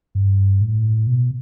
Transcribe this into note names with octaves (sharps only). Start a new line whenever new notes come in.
G2
A2
B2